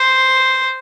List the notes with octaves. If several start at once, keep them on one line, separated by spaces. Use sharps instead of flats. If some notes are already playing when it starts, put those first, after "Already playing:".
Already playing: C5